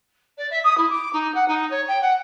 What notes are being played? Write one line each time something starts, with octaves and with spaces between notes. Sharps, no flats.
D5
E5
D#6
E4
D6
D#4
F#5
D#4
C#5
G5
F#5